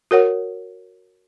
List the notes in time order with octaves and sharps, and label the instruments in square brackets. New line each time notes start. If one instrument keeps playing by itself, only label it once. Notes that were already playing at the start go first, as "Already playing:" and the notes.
[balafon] F#4 A#4 C#5 F#5